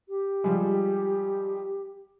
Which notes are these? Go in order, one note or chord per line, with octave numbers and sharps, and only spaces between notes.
G4
F3 G3 G#3